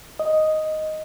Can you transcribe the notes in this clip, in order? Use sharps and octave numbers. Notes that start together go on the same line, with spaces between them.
D#5